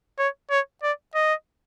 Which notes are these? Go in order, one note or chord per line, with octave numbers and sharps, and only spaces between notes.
C#5
C#5
D5
D#5